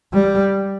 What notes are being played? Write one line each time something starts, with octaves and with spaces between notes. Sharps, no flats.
G3